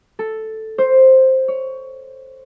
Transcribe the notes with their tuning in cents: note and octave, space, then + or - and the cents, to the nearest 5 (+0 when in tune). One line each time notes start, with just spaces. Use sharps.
A4 +0
C5 +5
C#5 +15